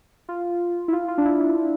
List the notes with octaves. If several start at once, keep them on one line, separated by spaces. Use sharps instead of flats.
F4
E4
F4
F4
D4
E4
D4